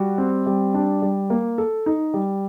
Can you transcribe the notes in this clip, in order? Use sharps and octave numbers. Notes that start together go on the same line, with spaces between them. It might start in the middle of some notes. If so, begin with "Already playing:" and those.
Already playing: G3 F#4
C4
G3
D4
G3
A#3
A4
D#4
G3